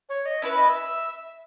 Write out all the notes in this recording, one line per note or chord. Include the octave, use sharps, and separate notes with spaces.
C#5
D#5
C#4 E4 B4 E5
D#5
E5